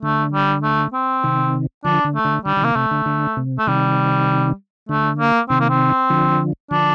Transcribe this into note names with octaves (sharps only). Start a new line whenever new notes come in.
D3 A3
G3
A3
C4
C3 D#3
D3 F3 D4
D3
A3
D3
D3 G3
D3
C3 D#3 A#3
C3 A3
D3
D3
C3
A3
C3 D#3 G3
D3 A3
A#3
C3 D#3 C4
A#3
C4
D3 F3
D3 F3 D4